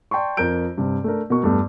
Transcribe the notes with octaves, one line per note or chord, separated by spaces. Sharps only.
D5 G5 A5 C6 C#6
F2 A#4 A#5 G6 D7
G2 C3
A3 D4 A#4
B2 A#4 C#6
E2 G2 A3